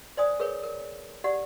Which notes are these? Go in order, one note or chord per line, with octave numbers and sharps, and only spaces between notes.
C5 D5 G#5 D#6
G#4 A#4 B4 C#5
A#4
G4 D5 F#5